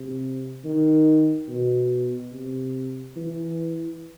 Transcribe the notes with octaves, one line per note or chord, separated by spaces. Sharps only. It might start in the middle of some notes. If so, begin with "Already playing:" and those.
Already playing: C3
D#3
B2
C3
E3